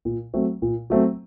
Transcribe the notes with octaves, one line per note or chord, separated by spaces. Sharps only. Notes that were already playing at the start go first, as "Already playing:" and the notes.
A#2
F#3 A3 C4
A#2
F#3 A3 C4